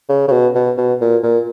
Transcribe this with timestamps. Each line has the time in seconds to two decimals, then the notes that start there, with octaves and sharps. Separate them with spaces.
0.09 C#3
0.28 C#3
0.32 B2
0.55 B2
0.78 B2
1.01 A#2
1.23 A#2